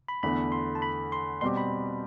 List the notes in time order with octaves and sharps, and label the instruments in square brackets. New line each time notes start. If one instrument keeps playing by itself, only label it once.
[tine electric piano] B5
[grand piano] E2 D3 A3 [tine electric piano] B5
[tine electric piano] C6
A5
B5
C6
[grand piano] B2 G3 C4 G4 [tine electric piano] C6
[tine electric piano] B5